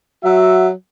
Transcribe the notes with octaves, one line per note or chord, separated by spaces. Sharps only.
F#3 F#4 E5